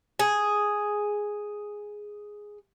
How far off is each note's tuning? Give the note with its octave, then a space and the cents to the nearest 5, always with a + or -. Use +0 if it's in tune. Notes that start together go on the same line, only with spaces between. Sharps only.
G#4 +0